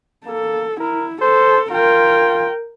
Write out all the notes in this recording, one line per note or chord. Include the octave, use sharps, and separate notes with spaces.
A#3 A4
E4 A#4
A4 C5
F4 A#4 G5